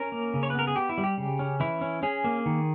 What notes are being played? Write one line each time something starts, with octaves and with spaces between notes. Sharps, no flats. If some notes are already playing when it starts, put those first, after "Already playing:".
Already playing: C#4 A#4
A#3
C#3
C#5
B4
B3 A#4
G#4
B3 G4
E4
G3
G4
C#3
C#4
E3 E4
C#4
C#4 G#4
A#3
D#3